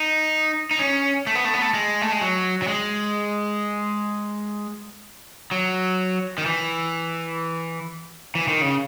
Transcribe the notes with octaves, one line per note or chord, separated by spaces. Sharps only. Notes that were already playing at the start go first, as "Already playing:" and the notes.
Already playing: D#4
D#4
C#4
A3
B3
A3
B3
A3
G#3
A3
G#3
F#3
F#3
G#3
F#3
D#3
E3
E3
D#3
C#3